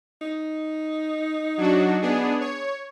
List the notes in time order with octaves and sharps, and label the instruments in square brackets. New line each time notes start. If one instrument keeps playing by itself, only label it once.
[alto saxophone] D#4
[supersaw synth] F#3 D4 F#4
B3 D4 G#4
C#5